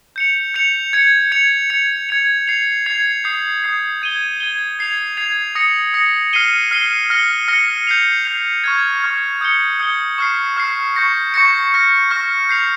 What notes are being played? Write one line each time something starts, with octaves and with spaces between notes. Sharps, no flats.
G6 C#7 F7
G6 C#7 F7
G#6 C#7 F7
G#6 C#7 F7
G#6 C#7 F7
G#6 C#7 F7
G#6 C7 F7
G#6 C7 F7
D#6 G6 C7 F7
D#6 G6 C7 F7
G#6 D#7 G7
G#6 D#7 G7
G#6 C7 F7
G#6 C7 F7
D#6 A#6 C#7
D#6 A#6 C#7
F6 C7 D#7 G7
F6 C7 D#7 G7
F6 A#6 C#7 G7
F6 A#6 C#7 G7
G6 C7 F7
G6 C7 F7
C#6 F6 G#6
C#6 F6 G#6
D#6 G6 C#7 G7
D#6 G6 C#7 G7
C#6 F6 C7
C#6 F6 C7
C#6 G6 A#6 C#7
C#6 G6 A#6 C#7
C#6 F6 A#6
C#6 F6 A#6
G6 C7 F7